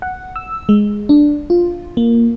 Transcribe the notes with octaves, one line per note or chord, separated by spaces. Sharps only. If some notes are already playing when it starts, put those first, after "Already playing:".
F#5
E6
G#3
D4
F4
A#3